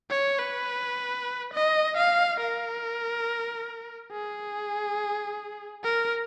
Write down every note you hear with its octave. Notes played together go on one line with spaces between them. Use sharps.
C#5
B4
D#5
F5
A#4
G#4
A#4